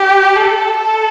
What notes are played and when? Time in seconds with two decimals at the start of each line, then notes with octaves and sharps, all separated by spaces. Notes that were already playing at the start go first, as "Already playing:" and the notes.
Already playing: G4
0.37 A4
0.77 A4